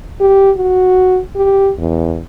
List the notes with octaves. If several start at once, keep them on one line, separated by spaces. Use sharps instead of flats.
G4
F#4
G4
E2